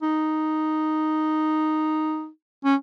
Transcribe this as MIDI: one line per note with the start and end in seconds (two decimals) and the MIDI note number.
0.02 2.29 63
2.65 2.75 61